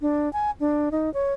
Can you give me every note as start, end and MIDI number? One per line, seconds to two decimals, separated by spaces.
0.01 0.31 62
0.33 0.51 80
0.60 0.89 62
0.91 1.12 63
1.14 1.33 73